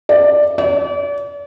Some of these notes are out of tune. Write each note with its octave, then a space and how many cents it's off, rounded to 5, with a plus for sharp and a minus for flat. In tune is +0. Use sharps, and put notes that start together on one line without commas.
D5 +10
D5 -40